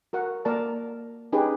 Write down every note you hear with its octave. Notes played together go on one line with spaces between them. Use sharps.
F#4 A#4 F#5
A#3 A#4 D5 A5
C#4 D#4 G4 G#4 B4